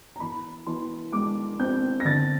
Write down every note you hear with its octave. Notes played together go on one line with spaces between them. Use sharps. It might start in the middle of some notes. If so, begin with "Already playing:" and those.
A#5
E3 B5
E3 C6
G#3 D6
C4 G6
A#6
D3 A6